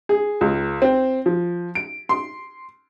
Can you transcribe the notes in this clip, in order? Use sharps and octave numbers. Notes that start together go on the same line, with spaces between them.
G#4
C#2
C4
F3
D7
C6